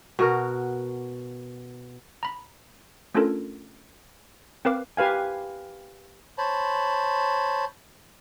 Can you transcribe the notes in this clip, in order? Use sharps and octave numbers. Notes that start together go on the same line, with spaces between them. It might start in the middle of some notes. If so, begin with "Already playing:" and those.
B2 F#4 A#4
A#5 B5
A3 C#4 D4 F4 A4 A#4
C4 A#4 B4 F5 D6
G4 B4 F5 G#5
C5 C#5 A5 B5